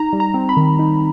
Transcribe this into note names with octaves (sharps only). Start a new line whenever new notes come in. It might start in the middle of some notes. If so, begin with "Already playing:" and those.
Already playing: D#4 A#5
G3
A#5
C4
B5
D#3
D#4